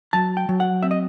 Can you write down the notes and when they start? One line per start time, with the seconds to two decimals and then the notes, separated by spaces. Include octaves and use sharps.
0.13 F#3 A5
0.37 G5
0.49 F#3
0.60 F#5
0.83 C4 E5
0.91 D#5